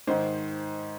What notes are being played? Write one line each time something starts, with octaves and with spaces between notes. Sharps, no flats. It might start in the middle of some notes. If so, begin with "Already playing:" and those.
G#2 D#3 C5